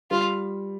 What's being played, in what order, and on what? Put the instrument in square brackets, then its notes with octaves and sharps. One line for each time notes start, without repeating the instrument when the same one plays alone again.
[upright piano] G3 [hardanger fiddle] F4